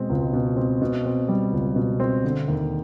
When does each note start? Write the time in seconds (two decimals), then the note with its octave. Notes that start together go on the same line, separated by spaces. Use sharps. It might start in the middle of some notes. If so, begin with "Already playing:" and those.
Already playing: B2 G#3 C4
0.10 C#2
0.33 B2
0.56 C4
0.82 B2
1.05 C4
1.28 G3
1.52 C#2
1.76 B2
2.00 C4
2.24 D3
2.48 D#2